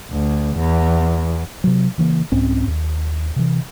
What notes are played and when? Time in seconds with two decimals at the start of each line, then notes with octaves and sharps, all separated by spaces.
0.10 D2
0.56 E2
1.64 C3 F#3
1.98 C#3 E3 A3 A#3
2.32 C2 G#2 C4 C#4
2.67 D#2
3.36 C3 E3